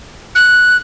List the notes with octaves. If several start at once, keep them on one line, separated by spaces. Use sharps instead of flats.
F#6